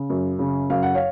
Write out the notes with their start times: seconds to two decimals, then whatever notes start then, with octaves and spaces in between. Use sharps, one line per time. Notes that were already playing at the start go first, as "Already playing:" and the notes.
Already playing: C#3
0.10 F#2
0.39 C#3
0.70 F#2 F5
0.83 F#5
0.95 C#5 F5